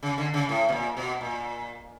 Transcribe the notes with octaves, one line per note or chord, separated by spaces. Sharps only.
C#3
D3
C#3
A2
B2
A#2
B2
A#2